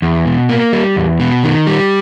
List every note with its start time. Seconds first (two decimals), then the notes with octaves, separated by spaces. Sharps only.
0.02 E2
0.26 B2
0.49 A#3
0.73 G3
0.96 E2
1.20 B2
1.43 D#3
1.67 G3